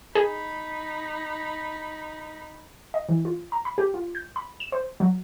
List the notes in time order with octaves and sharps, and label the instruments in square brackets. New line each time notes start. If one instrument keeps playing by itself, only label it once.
[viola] D#4 B5 [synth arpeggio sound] G#4
[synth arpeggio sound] D#5
E3
F4
A#5
B5
G4
F4
G6
B5
E7
C5
F#3